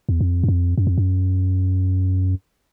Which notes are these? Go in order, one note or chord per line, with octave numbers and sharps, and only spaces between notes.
E2
F2
F#2
F2
F#2
F2
F#2